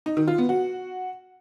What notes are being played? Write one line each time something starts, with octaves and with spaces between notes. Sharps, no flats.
D#4
D#3
F4
B3
F#4